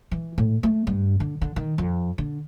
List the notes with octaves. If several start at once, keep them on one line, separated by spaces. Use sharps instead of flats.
E3
A2
A3
G2
D3
D3
D#3
F2
D3